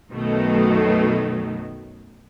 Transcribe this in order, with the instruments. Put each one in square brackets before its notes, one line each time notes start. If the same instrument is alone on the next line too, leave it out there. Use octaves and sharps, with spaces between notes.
[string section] B1 F#2 B2 D#3 F#3 A3